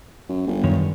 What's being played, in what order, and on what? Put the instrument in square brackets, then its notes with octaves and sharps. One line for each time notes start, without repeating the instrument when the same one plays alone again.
[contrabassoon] F#2
G1
[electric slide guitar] F#2 D#3 C#5